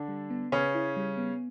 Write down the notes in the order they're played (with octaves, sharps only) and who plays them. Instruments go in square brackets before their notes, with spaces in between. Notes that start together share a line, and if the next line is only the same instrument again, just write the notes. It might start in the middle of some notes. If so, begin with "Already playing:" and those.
Already playing: [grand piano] D3 D4
[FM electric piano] G3
B3
[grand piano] C#3 C#4 [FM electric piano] B4
[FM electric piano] E4
G3
B3